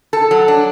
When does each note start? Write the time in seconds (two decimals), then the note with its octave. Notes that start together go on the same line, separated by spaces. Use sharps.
0.13 A4
0.31 F#3
0.48 D4